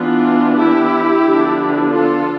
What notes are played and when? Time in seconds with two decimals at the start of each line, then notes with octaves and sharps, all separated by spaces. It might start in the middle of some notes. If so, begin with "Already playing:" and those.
Already playing: E3 B3 D4 F4
0.56 E4 G4
1.23 D3 F3 B3 D4
1.90 F4 A4